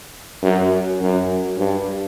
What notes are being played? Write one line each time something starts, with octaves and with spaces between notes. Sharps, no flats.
F#2
F#2
G2